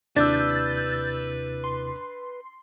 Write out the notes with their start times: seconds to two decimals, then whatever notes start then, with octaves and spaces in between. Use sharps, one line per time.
0.16 D#2 C3 D4 E4 B4 E6 G6 A6
1.64 C6